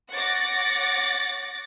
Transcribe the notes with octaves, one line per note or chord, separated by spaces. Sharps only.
C#5 F#5 D6 A6 A#6